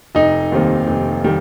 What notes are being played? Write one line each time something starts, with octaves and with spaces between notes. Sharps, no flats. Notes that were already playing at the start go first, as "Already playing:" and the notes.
F1 D#4 D#5
D#2 D#3 G3 C4
F1
D#3 G3